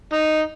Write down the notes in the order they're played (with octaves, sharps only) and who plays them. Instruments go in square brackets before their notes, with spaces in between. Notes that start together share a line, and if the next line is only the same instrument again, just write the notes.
[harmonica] D#4